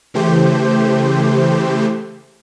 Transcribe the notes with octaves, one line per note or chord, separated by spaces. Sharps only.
C#3 E3 A3 G4 C5 G6